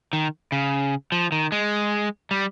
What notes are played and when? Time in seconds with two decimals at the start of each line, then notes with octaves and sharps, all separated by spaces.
0.13 D#3
0.52 C#3
1.12 F3
1.32 D#3
1.52 G#3
2.31 G3